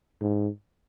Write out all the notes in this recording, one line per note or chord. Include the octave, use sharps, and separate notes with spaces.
G#2